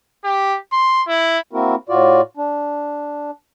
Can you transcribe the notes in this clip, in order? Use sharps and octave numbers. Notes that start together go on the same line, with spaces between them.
G4
C6
E4
A#3 C4 E4 F#4 A#4
A2 F4 F#4 D5
D4